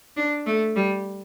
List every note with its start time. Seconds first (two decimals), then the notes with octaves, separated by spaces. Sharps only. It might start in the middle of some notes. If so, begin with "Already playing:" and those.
0.17 D4
0.46 A3
0.76 G3